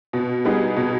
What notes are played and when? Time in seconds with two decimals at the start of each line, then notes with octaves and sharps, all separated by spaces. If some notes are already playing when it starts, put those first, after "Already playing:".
0.13 B2
0.45 G3 B3 D#4 G#4
0.77 B2